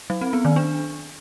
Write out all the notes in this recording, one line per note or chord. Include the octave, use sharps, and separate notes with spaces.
F#3
C4
B3
D#3
D4